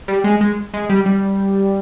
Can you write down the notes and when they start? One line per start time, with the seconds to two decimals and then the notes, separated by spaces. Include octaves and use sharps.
0.08 G3
0.24 G#3
0.41 G#3
0.74 G#3
0.89 G3
1.06 G3